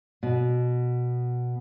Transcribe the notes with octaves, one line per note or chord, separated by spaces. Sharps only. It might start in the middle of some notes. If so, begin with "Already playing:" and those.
B2